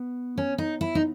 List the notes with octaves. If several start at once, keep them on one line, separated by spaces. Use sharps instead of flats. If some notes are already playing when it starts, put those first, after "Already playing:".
Already playing: B3
C#4
D#4
E4
D#4